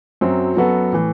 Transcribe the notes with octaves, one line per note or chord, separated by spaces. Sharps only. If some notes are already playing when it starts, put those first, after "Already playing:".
F#2 F#3 C4
F#2 F#3 B3 F#4 A4
A2 E3